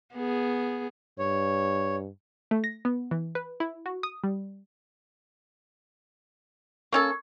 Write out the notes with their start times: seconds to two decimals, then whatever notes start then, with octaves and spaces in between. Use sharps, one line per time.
0.14 B3 G#4
1.19 G2 C#5
2.51 A3
2.64 A#6
2.85 B3
3.11 E3
3.35 B4
3.60 E4
3.86 F#4
4.03 D#6
4.24 G3
6.92 A#3 C#4 A4 C#6 G#6